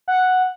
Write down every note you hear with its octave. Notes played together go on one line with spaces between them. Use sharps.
F#5